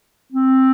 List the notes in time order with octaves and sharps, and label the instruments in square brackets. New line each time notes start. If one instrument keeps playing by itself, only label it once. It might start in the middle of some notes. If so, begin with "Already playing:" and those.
[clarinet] C4